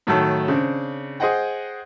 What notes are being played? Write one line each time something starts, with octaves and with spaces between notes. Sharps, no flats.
A2 D#3 F#3 A3 A4
C#3 C4 D4
G#4 C5 D#5 F#5 G5